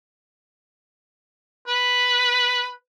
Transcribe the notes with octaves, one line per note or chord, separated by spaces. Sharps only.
B4